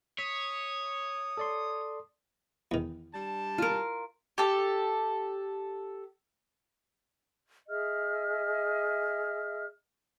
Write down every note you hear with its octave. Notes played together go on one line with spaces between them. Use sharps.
C#5 D#6 B6
A4 D5 C6
E2 D#3
G3 D4 A5
F4 A#4
G4 A4
G#4 D#5 E5 F6